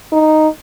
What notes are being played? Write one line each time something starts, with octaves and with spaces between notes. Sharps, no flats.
D#4